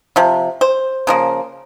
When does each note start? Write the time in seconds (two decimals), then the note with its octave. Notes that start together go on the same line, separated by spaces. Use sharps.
0.16 C3 F3
0.61 C5
1.07 C#3 F3 A#3